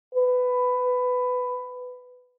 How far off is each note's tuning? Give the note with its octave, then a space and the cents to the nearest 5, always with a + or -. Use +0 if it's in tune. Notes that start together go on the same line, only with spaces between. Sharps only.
B4 +15